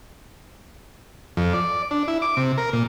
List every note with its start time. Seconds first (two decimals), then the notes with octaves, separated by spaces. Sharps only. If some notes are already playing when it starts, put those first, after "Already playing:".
1.37 F2
1.53 D5
1.91 D4
2.08 E4
2.22 D6
2.37 C3
2.58 A#4
2.73 A#2